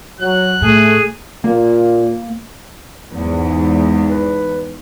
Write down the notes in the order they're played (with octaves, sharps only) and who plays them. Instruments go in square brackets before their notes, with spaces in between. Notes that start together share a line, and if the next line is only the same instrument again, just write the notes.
[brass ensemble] F#3 [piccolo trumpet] F#6
[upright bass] A2 [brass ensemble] A3 [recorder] G#4
[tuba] A#2 [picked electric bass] A#3
[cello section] E2 G#2
[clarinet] B4